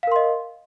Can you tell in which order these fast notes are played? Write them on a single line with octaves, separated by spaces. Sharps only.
F5 A#4 C6 D#5